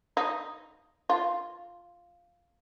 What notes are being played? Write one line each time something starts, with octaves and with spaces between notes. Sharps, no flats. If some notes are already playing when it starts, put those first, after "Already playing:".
D#4
F4